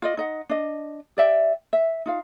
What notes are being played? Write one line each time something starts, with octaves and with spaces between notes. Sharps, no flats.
F4 D5 D#5
D#4 D#5 F#5
D4 D#5
G4 D5 E5 G5
E5
D#4 F4 F5